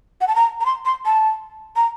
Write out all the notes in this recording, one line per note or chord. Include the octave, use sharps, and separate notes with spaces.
F#5
A5
A#5
A#5
C6
C6
A5
A#5